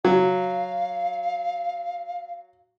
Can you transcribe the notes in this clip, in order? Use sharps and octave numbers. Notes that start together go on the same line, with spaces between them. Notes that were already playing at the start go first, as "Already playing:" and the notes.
F#3 F5